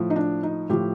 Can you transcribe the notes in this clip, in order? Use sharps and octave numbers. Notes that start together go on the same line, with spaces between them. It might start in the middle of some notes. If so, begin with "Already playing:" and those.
Already playing: A2 F3
D#4
D4
D#4
A2 F3 G4